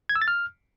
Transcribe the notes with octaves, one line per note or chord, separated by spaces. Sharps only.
G#6
E6
A6
F6